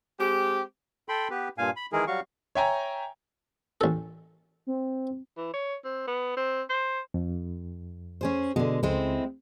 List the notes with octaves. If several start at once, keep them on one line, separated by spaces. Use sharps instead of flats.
G#3 C4 G4
A4 G5 B5 C6
B3 G4 B4
G2 A#2 F5 G#5
B5
D#3 E3 G#3 E4 G#4 A#4
F#3 G3 F#4 F5 C#6
C#5 E5 G5 G#5 A#5
A1 A4
C4
E3
C#5
C4
B3
C4
C5
F2
C#4 G#4 C5
B2 D3 G#3
C#2 G#3 C4 E4